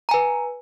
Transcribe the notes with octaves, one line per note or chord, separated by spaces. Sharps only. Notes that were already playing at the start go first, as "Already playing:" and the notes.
B4 G#5 A#5